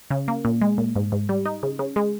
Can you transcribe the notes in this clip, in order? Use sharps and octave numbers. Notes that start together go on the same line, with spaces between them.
C#3
A#3
A#2
G#3
A#2
G#2
G#2
G3
D#4
C#3
C#3
G#3